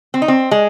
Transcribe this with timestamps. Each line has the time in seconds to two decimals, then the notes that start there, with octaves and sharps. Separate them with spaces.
0.14 C4
0.22 D#4
0.28 C4
0.51 G#3